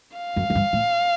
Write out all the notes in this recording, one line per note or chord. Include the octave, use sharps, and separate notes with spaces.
F5
F#2
F#2
G2
A2